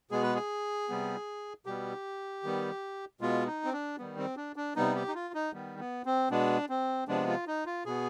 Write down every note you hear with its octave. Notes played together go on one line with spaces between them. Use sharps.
B2 G#3 B3 G#4
B4
G#4
C3 G3 B3
B2 G3 B3 G4
D#3 G3 B3
B2 G#3 B3 F4
D#4
C4
D4
D#3 G3 B3
C4
D4
D4
C3 G3 B3 D#4
G4
D#4
F4
D#4
D#3 G3 B3
B3
C4
B2 G#3 B3 D4
C4
C3 F3 G#3 B3 D4
F4
D#4
F4
B2 B3 G#4